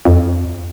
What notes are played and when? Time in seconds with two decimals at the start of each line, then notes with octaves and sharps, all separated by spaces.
0.05 F2